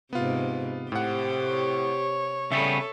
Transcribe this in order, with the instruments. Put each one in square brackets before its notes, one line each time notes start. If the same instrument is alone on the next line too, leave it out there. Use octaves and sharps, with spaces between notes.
[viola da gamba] G#2 C3 [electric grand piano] B3 F4
[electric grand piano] A2 F#5 [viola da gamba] C3 G4 C5
[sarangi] C#5
[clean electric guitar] C#3 G3 B3 [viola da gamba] A4 [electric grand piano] E5